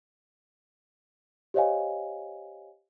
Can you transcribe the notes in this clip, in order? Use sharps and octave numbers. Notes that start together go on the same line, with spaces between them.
G4 C5 C#5 D#5 F5 G#5